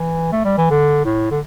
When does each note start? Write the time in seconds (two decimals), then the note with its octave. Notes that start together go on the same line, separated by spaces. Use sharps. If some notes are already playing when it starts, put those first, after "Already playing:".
Already playing: E3
0.32 A3
0.45 G3
0.58 E3
0.71 D3
1.05 A2
1.31 D3